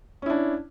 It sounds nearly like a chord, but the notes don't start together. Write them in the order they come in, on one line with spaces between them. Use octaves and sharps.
C#4 E4 D4